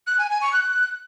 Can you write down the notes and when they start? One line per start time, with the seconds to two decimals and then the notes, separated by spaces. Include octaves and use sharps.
0.07 F#6
0.18 G#5
0.30 G#5
0.41 C#6
0.53 F#6